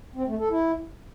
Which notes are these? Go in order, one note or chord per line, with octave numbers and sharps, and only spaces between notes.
C4
A3
A4
E4